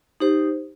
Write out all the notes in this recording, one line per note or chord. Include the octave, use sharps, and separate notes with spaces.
D#4 G4 C5